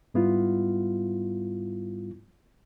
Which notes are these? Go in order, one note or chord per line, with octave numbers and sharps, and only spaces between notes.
G#2 G3 B3 E4 F4